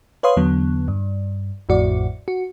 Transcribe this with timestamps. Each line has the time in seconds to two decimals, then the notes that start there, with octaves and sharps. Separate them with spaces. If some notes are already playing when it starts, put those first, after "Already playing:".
0.23 B4 C#5 F5 C6 D#6
0.37 E2 D3 F#3 B3
0.88 G2
1.69 A1 F2 A2 F#4 D5
2.28 F#4